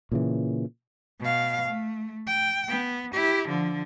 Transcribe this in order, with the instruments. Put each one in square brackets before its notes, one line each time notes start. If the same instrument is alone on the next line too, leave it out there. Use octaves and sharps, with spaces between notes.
[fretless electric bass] A#2 C#3 E3
[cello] B2 F5
A3
G5
B3
E4 G4
D3 F3